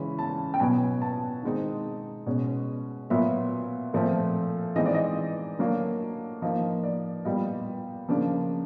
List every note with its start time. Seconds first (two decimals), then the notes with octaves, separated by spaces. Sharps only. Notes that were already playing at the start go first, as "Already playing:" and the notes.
Already playing: C#3 E3 G#3 C#4 B5
0.19 A5
0.54 G5
0.60 B2 F#3 B3 G#5
1.02 A5
1.43 D#3 G#3 C4 D#4
2.26 B2 G#3 C#4
3.10 A#2 F#3 B3 E5
3.94 A#2 F3 A3 C4
4.76 E3 G#3 C4 D#4 D#5
4.86 D5
4.95 D#5
5.59 D3 F#3 A#3 D4
6.42 F3 A#3 D#4 D#5
6.84 D5
7.25 A#2 G3 B3 D#5
8.09 C#3 F3 A#3 D4